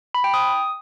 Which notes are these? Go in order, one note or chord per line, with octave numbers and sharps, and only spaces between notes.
B5
G5
D#6